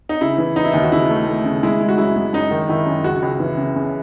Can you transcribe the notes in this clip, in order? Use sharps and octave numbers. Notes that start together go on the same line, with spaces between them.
D#4
C#3 E4
E3
E3 D#4
E4
D#2 D#4
F#4
C#3 E4
A3
A3
C#3
G#3 E4
G#3
F#4
F#2 E4
G#3
F#2 D#4
D#3
D#3 E4
F#2
C#2 F#4
C#2
E3
C#3
C#3